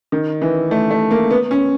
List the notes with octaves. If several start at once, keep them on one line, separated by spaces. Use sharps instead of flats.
D#3
E3
A3
A3
A#3
B3
C#4